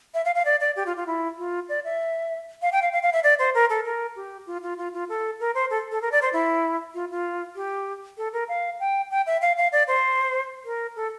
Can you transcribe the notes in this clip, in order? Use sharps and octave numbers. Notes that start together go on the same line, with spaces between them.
E5
F5
F5
D5
D5
G4
F4
F4
E4
F4
D5
E5
F5
G5
F5
F5
F5
E5
D5
C5
A#4
A4
A#4
G4
F4
F4
F4
F4
A4
A#4
C5
A4
A4
A#4
D5
C5
E4
F4
F4
G4
A4
A#4
F5
G5
G5
E5
F5
F5
D5
C5
A#4
A4